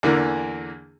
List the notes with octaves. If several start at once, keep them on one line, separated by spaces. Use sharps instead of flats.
E2 D3 E3 A#3